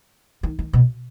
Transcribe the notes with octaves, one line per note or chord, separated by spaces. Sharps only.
D#3
D#3
B2